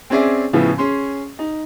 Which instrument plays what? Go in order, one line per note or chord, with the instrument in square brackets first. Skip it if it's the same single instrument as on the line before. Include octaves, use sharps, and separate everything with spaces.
[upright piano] C4 C#4 G#4 D5 E5
A2 C#3 F3 B3 E4
C#4 G#4 C6
D#4